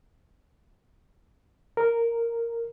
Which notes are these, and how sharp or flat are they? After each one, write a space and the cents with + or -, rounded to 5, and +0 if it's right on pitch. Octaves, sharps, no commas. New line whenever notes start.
A#4 -5